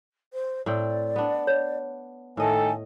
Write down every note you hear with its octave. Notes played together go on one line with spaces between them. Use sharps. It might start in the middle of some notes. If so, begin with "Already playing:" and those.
C5
A2 C4 D5 G5
B3 D4
C#5
A2 D#3 A3 A4 D#5 G#5